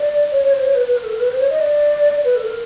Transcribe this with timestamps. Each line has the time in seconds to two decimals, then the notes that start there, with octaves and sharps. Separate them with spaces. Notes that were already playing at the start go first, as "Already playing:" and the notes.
Already playing: D5
0.31 C#5
0.42 C#5
0.53 C5
0.63 C#5
0.75 B4
0.86 B4
0.96 A#4
1.04 A4
1.12 A#4
1.20 B4
1.28 C5
1.39 C#5
1.49 D#5
1.59 D5
2.24 B4
2.35 A4
2.45 A#4